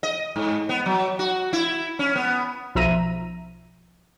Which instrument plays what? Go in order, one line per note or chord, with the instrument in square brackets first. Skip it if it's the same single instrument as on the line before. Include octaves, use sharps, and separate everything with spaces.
[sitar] D#5
G#2
B3
F#3
F#4
E4
C#4
B3
[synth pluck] B1 F3 E5 A#5 D#7